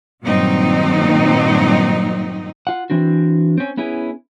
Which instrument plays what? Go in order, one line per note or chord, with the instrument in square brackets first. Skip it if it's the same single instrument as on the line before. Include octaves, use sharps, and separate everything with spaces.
[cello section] G2 A#2 D#3 F#3 C4 D#4
[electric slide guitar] F4 F#5
E3 C4 D4 F#4
C4 C#4
B3 C#4 E4 G#4